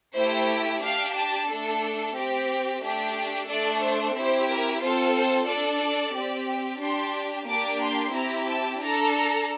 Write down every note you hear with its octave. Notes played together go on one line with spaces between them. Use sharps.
A3 E4 G4 C5
D4 G4 F5
A5
A3 D4 A4
C4 G4
A3 D4 G4
A3 D4 A4 D5
C5
C4 E4 G4 C5
A#4
C4 F4 A4 C5
C5
D4 A4 D5
C4 G4
D4 G4 C6
A#3 D4 G4 D6
C6
C4 E4 G4 A#5
A5
D4 A4 A#5
A#5